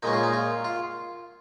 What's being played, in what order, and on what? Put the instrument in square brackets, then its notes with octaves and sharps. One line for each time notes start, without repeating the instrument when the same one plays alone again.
[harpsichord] A#2 G#3 C#4 D#4
F4
D#4
F4
F4